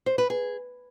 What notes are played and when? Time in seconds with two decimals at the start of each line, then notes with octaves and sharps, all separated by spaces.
0.06 C5
0.18 B4
0.30 G#4